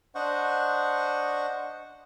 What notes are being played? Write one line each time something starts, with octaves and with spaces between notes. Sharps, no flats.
D4 C5 D#5 F#5 C#6